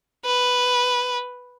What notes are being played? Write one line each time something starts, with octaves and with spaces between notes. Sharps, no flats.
B4